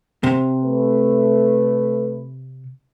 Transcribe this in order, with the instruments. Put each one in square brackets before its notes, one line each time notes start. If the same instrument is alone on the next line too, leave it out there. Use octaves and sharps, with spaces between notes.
[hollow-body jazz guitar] C3
[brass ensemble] A3 B4